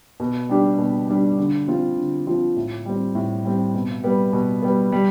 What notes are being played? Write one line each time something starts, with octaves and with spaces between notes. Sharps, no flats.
B2
G3 D4 G4
B2
G3 D4 G4
D3
F3 C4 F4
D3
F3 C4 F4
A2
G3 C4
A2
G3 C4
B2
G3 B3
B2
G3 B3
G3